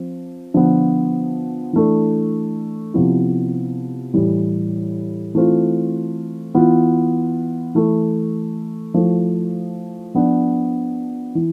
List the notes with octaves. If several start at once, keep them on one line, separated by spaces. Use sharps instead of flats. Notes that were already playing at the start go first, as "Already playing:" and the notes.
Already playing: F3 C4
D3 F3 B3 F4
E3 A3 D4
C3 F3 B3 E4
A2 E3 G3
E3 A3 C4 F4
E3 B3 F4
E3 A3 E4
F3 A3 E4
F3 B3 D4
E3